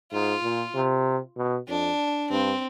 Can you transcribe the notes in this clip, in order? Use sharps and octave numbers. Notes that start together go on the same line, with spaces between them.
G#2 F4
A#2
C3
B2
F2 D4
G2 C4